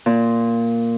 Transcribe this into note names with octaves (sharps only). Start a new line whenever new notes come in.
A#2